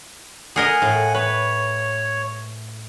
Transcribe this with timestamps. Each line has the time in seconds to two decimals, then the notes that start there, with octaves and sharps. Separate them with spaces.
0.56 G#4 A#4 D#5 F#5 G#5
0.82 A2
1.15 B4 C#5